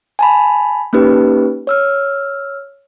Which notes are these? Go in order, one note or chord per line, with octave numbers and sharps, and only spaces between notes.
G#5 A5 B5
A#3 C#4 D#4 G4 B4
C#5 E6 F6